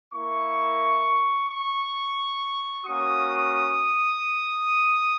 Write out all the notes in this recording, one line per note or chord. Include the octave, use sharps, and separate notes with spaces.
A#3 E4 C#6
C#6
A#3 C#4 F#4 D#6